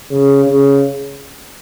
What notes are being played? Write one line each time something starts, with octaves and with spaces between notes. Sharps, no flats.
C#3
C#3